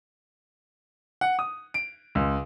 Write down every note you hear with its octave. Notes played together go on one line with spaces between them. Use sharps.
F#5
D#6
D7
C#2